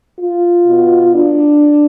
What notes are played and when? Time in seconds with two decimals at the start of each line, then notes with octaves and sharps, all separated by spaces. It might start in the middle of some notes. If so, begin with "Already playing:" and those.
0.19 F4
0.66 B2 B3
1.15 D4